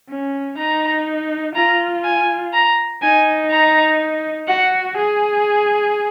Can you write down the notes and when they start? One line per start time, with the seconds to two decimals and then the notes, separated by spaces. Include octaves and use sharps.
0.09 C#4
0.58 D#4 A#5
1.55 F4 A#5
2.04 G#5
2.53 A#5
3.02 D#4 G#5
3.51 A#5
4.48 F#4 F#5
4.97 G#4